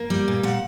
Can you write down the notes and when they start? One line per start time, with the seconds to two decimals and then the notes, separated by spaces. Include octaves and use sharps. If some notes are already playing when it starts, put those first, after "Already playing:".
Already playing: A#3
0.10 G3
0.28 A#2
0.43 A#2 F#5